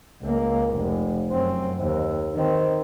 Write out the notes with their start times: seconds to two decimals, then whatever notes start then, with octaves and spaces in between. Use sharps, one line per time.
0.23 C#2 A#3
0.70 F1
1.30 F#2 C4
1.79 D#2
2.35 D#3 C4